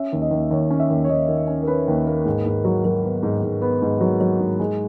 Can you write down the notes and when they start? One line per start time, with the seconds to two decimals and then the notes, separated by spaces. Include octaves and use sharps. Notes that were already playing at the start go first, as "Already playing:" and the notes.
Already playing: C#4 E5
0.12 D#2
0.22 D#5
0.31 D#2
0.51 D#2 C#5
0.71 C#4
0.80 E5
0.90 D#2
1.04 C#5
1.09 D#2 D#5
1.28 D#3
1.48 C#4
1.62 A#4
1.67 C#4 B4
1.88 D#2
2.07 A#3
2.25 G#2
2.46 G#2
2.65 F#3
2.85 F#3 A#4
3.04 B3
3.23 G#2
3.43 G#2
3.62 B3
3.82 G#2
4.01 F#3
4.21 F#3
4.40 G#2
4.60 G#3